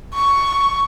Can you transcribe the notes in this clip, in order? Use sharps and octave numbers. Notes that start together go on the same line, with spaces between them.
C#6